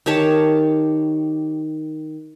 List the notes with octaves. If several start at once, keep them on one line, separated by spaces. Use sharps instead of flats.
D#3 G4 C#5 A5